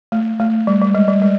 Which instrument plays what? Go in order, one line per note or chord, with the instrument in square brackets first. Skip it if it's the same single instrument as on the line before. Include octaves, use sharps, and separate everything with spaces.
[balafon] A3
A3
G3
G3
G#3
G3
G#3